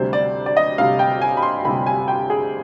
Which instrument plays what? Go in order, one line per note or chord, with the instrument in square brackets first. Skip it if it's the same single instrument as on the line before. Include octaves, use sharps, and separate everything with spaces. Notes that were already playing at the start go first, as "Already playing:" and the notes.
Already playing: [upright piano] D2 C3 G3 C5
D5
D5
D#5
D2 C3 G3 F5
G5
G#5
B5
C6
D2 C3 G3 B5
G#5
G5
G#4